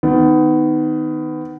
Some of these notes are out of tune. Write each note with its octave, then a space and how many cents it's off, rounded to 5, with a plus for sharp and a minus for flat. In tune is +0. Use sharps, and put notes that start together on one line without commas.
D#3 +0 B3 +20